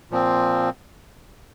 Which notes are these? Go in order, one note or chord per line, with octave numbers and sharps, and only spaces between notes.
A#2 F3 C4